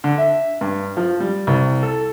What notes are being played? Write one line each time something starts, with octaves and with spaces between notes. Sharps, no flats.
D3
E5
G2
F3
G3
C2
A4